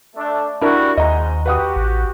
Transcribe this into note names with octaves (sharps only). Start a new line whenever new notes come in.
A3 D4
G3 D4 E4 F#4 A#4
D#2 G#2 D#5 A#5
F#4 G4 B4 F#5 D#6
A1